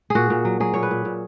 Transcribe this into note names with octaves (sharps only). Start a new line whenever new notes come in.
A#2 F#4 G#4
A#2
F#3
F#3 G#4
A#2 C#5
B4
A#2
A#2